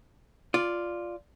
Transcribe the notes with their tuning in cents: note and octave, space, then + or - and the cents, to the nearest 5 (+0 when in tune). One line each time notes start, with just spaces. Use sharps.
F4 +0 D5 +0